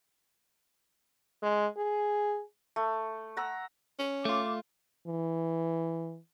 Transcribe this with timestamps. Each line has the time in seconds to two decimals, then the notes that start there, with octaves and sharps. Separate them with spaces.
1.43 G#3
1.77 G#4
2.76 A3
3.37 F#5 A#5 E6
3.99 C#4
4.25 A3 F4 D6
5.08 E3